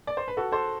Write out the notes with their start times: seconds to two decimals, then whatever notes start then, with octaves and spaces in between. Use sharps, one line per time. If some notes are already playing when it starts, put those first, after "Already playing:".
0.07 D5
0.17 C5
0.28 B4
0.37 F#4 A4
0.52 A4 C5